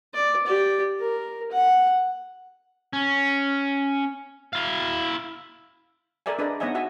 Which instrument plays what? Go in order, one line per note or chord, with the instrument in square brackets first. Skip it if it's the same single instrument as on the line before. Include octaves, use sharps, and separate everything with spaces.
[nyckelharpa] D5
G4 D5
A#4
F#5
[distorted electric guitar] C#4
E4 F5
[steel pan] A4 A#4 D5 E5 G#5
D4 G#4 B4 D5 D#5
B3 D#4 C#5 D#5 E5 G#5
F#4 E5 G#5